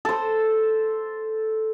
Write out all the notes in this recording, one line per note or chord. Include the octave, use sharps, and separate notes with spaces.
A4 C5